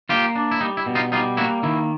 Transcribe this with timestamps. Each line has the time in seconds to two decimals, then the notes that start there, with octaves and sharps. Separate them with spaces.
0.09 A#3 F4 G4
0.35 D4
0.51 E4
0.61 G3 D#4
0.77 E4
0.86 B2
0.95 D#4 F4
1.12 G3 D#4 F4
1.37 A#3 E4 F#4
1.63 D#3 E4